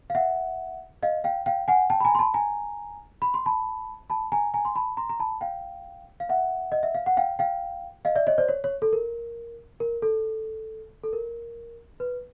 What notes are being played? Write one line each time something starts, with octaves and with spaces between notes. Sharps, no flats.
F5
E5 F#5
D#5 F5
F5 G5
F5 G5
F#5 G#5
G5 A5
B5
G#5 A#5
C6
A5 B5
G#5 A#5
B5
C6
A5 B5
A5 B5
G#5 A#5
G#5 A#5
C6
A5 B5
A#5 C6
A#5
A5 B5
F5 G5
F5
E5 F#5
D#5
E5
F5
F#5
F5 G5
F5 G5
D#5 F5
D5 E5
C#5 D#5
C5 D5
C#5
C#5
A4
A#4
A#4
A4
A4
A#4
B4